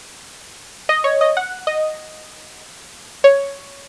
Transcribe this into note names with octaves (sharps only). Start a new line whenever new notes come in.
D#5
C#5
D#5
F#5
D#5
C#5